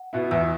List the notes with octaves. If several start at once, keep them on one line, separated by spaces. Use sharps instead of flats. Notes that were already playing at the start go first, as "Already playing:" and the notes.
Already playing: F#5
B2 B3 E4
E2 E5 E6